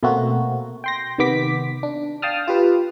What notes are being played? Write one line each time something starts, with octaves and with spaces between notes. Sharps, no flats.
B2 A3 A#3 C4 F#4
G5 C6 A#6
C3 D#3 B3 D6 B6
D4
F5 G5 A5 D#6 F6
F4 G4 B4